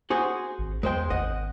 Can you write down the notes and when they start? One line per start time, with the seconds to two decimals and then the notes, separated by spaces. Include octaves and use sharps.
0.10 F#4 G#4 C5
0.58 G#1
0.83 E2 G#3 C5 G5
1.10 G#1 D#5 F#5